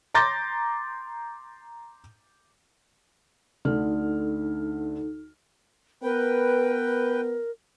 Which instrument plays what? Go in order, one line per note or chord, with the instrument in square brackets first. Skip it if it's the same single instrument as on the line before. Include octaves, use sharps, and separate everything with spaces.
[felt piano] A#5 C6 D6 G6 A6 A#6
[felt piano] D2 D3 F6 [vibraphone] D#4 A4
[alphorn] B3 [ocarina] A#4 [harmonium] B4 G5